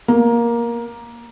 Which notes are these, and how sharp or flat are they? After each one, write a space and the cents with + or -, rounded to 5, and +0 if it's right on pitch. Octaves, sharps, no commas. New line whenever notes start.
A#3 +10